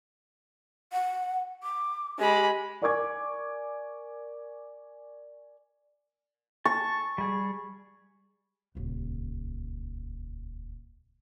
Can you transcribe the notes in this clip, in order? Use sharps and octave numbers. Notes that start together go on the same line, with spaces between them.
F#5
D6
G#3 G4 B5
A#4 D5 G#5 C#6 D6 G#6
A5 C#6
G3 G#4
D#1 C#2